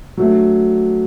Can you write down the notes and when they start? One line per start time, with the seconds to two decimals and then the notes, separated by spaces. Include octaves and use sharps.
0.17 F#3 A3 D4